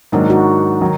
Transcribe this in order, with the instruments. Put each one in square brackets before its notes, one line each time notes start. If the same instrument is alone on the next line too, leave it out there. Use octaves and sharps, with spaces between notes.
[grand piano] G#2 D#3 F#3 A#3 D4 [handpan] D#4
[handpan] F#4
[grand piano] D#3 F#3